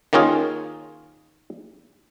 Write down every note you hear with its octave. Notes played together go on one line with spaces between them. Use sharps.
D#3 A#3 C#4 F4 G#4